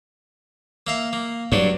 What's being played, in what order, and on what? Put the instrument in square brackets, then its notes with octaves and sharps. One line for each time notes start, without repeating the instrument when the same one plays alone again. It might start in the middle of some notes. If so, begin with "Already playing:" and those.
[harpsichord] A#3 E5 F5
A#3
[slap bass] G2 [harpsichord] F#3 D4